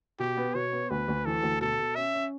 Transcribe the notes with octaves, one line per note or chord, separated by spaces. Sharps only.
B2 G4
B3
B2 C#5
B3
D2 B4
D2
E3 A4
D2
B2 A4
B2
C#4 E5
C#4